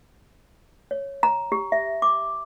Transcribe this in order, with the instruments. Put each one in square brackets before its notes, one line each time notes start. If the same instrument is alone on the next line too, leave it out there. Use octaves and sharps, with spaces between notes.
[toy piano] C#5
A#5
G4
E5
D6